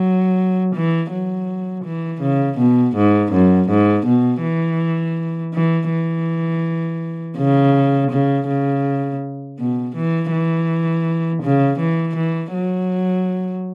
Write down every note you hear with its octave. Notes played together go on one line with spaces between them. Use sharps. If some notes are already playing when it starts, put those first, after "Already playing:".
Already playing: F#3
E3
F#3
E3
C#3
B2
G#2
F#2
G#2
B2
E3
E3
E3
C#3
C#3
C#3
B2
E3
E3
C#3
E3
E3
F#3